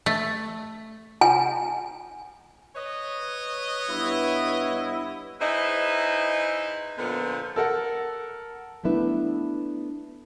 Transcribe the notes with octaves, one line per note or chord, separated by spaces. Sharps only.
A3
G#5
B4 C#5 D#5
G2 B3 E4
D#4 E4 G#4 B4 C5 D#5
A#2 D3 F3 B3
A4 A#4 F#5
A3 B3 D4 E4 B4